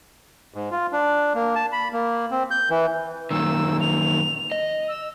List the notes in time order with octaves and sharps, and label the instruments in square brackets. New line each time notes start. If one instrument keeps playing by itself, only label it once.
[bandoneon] G#2
F4
D4
A#3
A5
B5
A#3
C4
G6
E3
[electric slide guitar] F#2 A#2 D#3 [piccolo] E6
[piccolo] F7
[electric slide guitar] D#5
[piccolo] E6